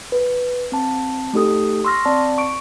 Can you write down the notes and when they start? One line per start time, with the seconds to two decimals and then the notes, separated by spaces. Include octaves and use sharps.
0.12 B4
0.72 C4 A5
1.33 A3 D#4 G4 A4 D#6
1.84 C6 C#6 E6 F6 A#6
2.05 C4 D5 A5
2.38 C#6 D7